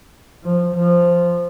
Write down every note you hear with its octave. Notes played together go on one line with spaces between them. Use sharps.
F3
F3